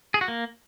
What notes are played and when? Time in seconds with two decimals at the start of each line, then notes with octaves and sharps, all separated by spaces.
0.14 G#4
0.21 F#4
0.28 A#3